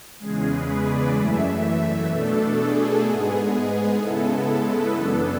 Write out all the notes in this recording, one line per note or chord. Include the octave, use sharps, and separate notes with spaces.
E2 C#3 G#3 G#4
B4
D5
F#2 E3 A3 E5
B2 A3 D4 A4
G#4
G#2 G#3 B3 G#4
C#3 G#3 B3 E4 A4
A4
B4
F#2 E3 B3 D4 A4